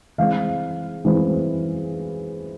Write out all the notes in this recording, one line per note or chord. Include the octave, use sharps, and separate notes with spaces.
E3 G#3 C4 F5
E3 G#3 C4